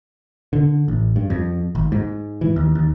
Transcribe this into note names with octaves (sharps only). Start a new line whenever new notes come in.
D3
A1
G2
F2
G#1
G#2
E3
D#2
D#2